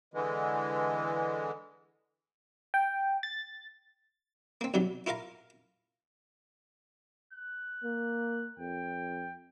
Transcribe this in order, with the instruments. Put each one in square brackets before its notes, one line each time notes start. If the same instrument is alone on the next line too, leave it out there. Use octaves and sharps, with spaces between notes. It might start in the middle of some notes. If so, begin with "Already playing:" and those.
[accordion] D3 E3 G#3
[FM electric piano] G5
A6
[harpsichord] A#3 C4
B1 C3 F#3 G3
E4 F4 A#4 F5 A#5
[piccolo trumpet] F#6
[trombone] A#3
[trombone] F2 [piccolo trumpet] G5